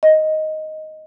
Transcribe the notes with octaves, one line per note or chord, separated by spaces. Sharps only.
D#5